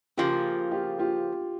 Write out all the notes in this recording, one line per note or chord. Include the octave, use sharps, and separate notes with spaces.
C#3 F3 A#3 F4 G4
F4 G4
F4 G4